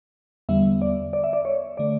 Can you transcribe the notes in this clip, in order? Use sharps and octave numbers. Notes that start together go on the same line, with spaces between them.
E2 D3 G3 B3 E5
D5
D5
E5
D5
C#5
D3 A3 D5